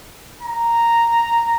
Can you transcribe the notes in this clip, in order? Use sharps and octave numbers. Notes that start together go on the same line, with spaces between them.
A#5